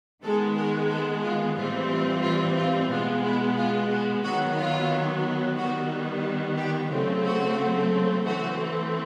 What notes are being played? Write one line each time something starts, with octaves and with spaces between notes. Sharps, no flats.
D#3 G#3 B3 A4
A#4
A4
F4
A2 E3 G3 C4 F4
F4
F4
F4
B2 G#3 B3 F4
E4
F4
F#4
D#3 F#3 B3 F#4
F4
D#3 G3 B3 F#4
G4
C#3 F#3 A3 C4 F4
F#4
E3 A3 C4 F#4